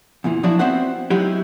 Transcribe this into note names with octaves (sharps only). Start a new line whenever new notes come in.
E2 A#2 E3
F3 F#3 D4 E4 F#4 D5
B3 C4 F#4 C5 E5 F#5
F#3 G#3 D#4 E4 F#4 G4